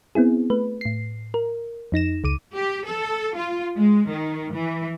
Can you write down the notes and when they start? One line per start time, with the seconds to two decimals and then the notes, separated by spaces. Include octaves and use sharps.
0.15 B3 C4 E4 G#4
0.50 A3 B4
0.81 A2 C7
1.34 A#4
1.92 F2 D#4 A#6 E7
2.24 C#2 D6 D#7
2.55 G4
2.86 A4
3.35 F4
3.77 G#3
4.10 D#3
4.52 E3